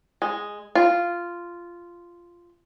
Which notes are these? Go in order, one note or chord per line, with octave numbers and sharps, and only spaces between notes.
G#3
F4